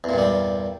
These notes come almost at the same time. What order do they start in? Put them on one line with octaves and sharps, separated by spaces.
E2 A#2 G2 G3